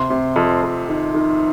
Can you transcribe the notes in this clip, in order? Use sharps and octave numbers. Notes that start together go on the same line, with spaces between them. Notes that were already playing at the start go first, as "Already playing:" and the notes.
Already playing: C3 C6
C3
F2
F2
D#3
D#3